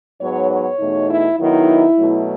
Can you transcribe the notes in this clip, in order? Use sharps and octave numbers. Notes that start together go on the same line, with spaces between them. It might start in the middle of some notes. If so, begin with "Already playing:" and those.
G#2 F#3 B3 D#4 C#5
C#5
E2 B2 A3 D#4
E4
D#3 F#3 B3 D#4 E4
B2 F#3 A3